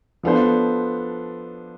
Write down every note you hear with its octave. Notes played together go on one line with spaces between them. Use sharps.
F3 B3 D4 A4 C5